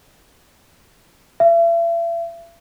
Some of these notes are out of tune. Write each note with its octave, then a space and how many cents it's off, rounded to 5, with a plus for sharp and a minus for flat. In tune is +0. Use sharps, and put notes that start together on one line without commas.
E5 +40